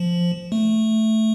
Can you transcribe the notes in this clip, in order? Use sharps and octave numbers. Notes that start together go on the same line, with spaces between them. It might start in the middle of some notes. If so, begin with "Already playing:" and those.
Already playing: F3
A3